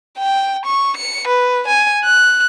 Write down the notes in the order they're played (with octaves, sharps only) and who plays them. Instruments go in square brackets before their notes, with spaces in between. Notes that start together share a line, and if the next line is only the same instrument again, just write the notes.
[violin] G5
C#6
C#7
B4
G#5
F#6